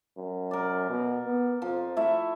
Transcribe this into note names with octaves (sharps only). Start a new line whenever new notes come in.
F#2
A#4 D5
B2
B3
F2 F3
A3 E4 E5